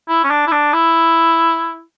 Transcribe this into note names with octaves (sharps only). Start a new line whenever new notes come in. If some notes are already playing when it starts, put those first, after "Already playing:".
E4
C#4
D4
E4
D4
E4